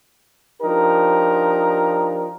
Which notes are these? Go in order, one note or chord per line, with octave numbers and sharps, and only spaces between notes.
F3 D4 D#4 G4 A#4